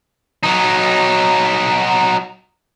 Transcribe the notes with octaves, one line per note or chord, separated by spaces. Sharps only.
F#3 D#4